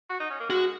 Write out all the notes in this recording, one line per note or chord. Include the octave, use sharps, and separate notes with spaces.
F#4
D#4
C#4
A#3
G#3 F#4